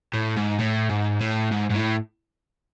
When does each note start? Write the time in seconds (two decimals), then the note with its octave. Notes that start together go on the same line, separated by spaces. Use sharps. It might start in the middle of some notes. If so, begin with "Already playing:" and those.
0.14 A2
0.37 G#2
0.60 A2
0.90 G#2
1.21 A2
1.51 G#2
1.70 G#2
1.74 A2